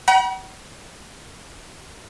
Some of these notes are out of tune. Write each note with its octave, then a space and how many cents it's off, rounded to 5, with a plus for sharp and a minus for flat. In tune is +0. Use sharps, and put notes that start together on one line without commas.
F#5 +40 B5 -45